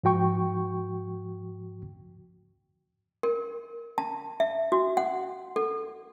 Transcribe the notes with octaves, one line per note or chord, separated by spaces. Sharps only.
G#2 F3 F#4 G5 C#6
A#4
A5
E5
F#4
F#5
A4